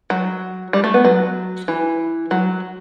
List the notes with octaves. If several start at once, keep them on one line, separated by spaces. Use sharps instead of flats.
F#3
G3
A3
B3
F#3
E3
F#3